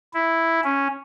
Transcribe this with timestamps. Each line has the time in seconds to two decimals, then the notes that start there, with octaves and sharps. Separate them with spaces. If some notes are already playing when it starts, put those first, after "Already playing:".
0.14 E4
0.64 C#4